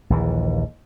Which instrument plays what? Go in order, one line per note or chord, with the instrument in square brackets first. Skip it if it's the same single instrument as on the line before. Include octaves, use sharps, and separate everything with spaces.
[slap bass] A#1 D#2 E3